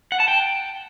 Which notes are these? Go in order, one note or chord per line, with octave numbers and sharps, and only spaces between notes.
F#5
A5
G5